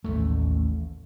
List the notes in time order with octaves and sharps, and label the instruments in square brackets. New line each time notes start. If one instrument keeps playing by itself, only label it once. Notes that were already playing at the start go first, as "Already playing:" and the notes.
[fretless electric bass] A1 D#2 G#2 A3